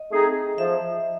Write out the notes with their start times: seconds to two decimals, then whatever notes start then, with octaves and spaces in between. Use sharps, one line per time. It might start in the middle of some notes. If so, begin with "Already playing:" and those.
Already playing: D#5
0.11 A3 C4 D#4 G#4
0.58 F3 E5